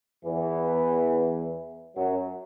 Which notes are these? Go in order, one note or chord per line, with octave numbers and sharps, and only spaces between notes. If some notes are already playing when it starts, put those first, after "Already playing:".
E2 E3
F#2 F#3